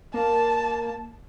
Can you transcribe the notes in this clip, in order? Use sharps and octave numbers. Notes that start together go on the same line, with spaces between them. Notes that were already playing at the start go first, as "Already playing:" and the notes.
A#3 A5